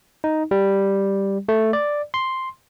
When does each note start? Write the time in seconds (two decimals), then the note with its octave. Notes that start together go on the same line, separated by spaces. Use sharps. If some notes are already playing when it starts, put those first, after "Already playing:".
0.24 D#4
0.51 G3
1.49 A3
1.73 D5
2.14 C6